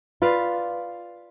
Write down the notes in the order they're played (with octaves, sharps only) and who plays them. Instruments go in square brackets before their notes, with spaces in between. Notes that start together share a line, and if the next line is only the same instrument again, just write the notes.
[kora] F4 B4 D5 F5